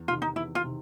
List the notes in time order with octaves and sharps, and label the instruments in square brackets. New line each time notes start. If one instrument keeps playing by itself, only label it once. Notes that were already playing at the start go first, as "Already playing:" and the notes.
Already playing: [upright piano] E2
[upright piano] C3 D#3 [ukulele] F4
[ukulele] D#4
[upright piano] E2 [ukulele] E4
[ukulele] F4
[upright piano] C3 D#3